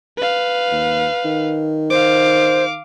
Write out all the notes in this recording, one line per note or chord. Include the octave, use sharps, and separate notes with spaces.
B4 F5
D#2
D#3
C5 F5 D6